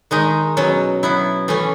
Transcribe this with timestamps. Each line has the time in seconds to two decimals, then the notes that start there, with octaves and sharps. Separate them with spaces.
0.11 D#3 G#3 D#4
0.57 B2 F#3 C#4
1.03 F#3 B3 E4
1.48 E3 A3 C#4